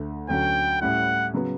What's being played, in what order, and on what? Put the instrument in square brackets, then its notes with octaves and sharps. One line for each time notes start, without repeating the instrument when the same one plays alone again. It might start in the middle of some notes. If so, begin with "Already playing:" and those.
Already playing: [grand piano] D2 D3 A3
[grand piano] D2 D3 F#3 C#4 F#4 [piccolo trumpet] G5
[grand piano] A2 G3 C#4 E4 [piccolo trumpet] F#5
[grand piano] C#3 F#3 B3